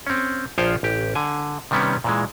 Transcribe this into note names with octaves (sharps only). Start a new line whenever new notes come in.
C4 C#4
A#1 F3 F4 C5 C#5 G5
A1 G4
D3 G#5
C3 D#3 G3 B3 C#4
A#2 E3 G#3